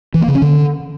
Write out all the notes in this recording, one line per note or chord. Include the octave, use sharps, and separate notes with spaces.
E3
A#3
C#3
C#4
D3